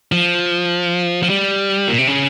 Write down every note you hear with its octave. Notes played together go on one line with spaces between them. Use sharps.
F3
F3
G3
A#2
C3
C#3